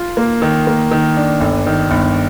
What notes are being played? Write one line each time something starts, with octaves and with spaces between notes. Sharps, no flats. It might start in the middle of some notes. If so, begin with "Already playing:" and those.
Already playing: F4
A#3
D#3
A#3
D#3
D4
G1
D#3
G1